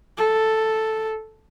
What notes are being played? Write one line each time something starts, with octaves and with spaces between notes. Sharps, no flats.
A4